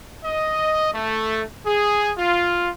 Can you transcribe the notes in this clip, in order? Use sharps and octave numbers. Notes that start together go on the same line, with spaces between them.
D#5
A3
G#4
F4